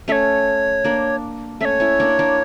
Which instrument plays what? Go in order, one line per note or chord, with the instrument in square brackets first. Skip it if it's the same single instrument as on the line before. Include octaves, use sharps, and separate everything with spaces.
[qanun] A3 C#4 [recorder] C#5 E5
[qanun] A#3 D4
[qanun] A3 C#4 [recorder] C#5 E5
[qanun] C#4 E4
A#3 D4
A#3 D4